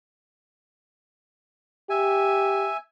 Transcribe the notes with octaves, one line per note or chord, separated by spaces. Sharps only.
G4 E5 G#5